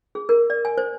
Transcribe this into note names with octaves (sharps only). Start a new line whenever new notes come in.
G#4
A#4
D5
G#5
C5